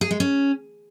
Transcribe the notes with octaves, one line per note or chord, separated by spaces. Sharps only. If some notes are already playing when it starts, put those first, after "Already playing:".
G#4
G#3
C#4